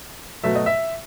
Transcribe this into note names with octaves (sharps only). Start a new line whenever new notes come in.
B2 F#3 A3 E5
D#5
E5